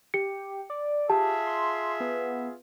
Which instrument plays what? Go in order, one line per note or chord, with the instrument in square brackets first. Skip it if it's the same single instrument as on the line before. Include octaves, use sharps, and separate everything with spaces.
[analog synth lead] G4 [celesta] C#7
[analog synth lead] D5
[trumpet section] F4 G#4 E5 [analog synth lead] G4 [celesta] A5
[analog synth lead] C6
B3